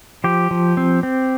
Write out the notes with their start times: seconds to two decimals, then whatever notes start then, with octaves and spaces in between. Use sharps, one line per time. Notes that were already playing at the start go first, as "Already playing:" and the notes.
0.24 F3 G4
0.51 F3
0.77 C4
1.03 C4